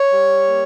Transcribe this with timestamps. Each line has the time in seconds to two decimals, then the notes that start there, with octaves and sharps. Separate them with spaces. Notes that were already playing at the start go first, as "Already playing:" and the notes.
Already playing: C#5
0.11 G3
0.47 A#3